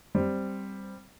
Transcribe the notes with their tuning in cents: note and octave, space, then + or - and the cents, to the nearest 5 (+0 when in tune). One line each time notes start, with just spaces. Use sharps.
G3 +0 C4 +0